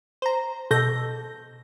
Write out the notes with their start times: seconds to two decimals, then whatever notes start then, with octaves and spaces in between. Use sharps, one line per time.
0.22 C5 A#5
0.71 B2 A4 G6 A#6